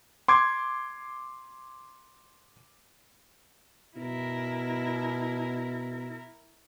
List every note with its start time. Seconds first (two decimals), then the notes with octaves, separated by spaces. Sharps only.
0.28 C6 D6 G#6
3.97 B2 E4 A#4